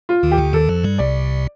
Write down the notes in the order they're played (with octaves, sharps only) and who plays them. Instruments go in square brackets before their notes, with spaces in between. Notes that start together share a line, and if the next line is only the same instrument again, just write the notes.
[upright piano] F4
[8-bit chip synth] D#2 D#3
[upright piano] G4
[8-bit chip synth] D2 D3
[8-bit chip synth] D#2 D#3 [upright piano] A4
[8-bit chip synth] F2 F3
G2 G3
[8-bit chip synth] C2 C3 [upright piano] D5